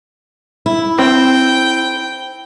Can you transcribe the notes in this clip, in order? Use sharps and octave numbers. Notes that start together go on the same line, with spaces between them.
E4
C4 G5